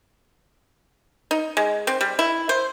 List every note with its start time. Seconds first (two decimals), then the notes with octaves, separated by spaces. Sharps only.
1.31 D#4
1.57 G#3
1.87 C4
2.01 G3
2.19 E4
2.49 C5